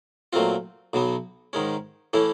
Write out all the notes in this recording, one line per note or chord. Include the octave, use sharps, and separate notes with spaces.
A#2 F#3 A3 C4 F4
B1 B2 F#3 B3
G#2 D#3 G#3 C#4
A2 E3 A3 C#4 E4